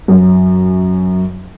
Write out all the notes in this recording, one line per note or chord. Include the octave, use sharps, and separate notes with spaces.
F#2